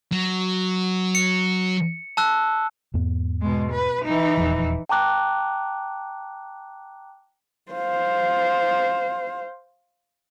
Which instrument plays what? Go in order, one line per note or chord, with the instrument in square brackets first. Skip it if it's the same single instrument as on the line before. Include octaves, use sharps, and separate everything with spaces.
[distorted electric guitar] F#3
[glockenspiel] C#7
A5 E6 F#6
[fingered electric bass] E2 G#2 B3
[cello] B2 G#3
B4
E3 D#4
[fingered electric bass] D#1 E2 F3
[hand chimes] G5 A5 A#5 D6 F#6
[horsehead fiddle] C5 F5